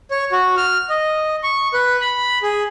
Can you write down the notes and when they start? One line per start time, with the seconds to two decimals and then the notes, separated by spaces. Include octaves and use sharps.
0.11 C#5
0.32 F#4
0.57 F6
0.89 D#5
1.44 C#6
1.74 B4
2.01 B5
2.43 G#4